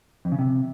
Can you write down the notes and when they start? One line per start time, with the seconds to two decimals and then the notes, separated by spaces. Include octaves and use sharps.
0.25 F2
0.32 C#3
0.39 C3